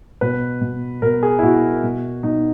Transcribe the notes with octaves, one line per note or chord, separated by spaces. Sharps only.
B2 B4
B2
B2 A#4
G#4
E4
B2 F#4
B2
B2 D#4